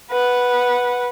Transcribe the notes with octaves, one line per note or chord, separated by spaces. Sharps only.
B4 F#5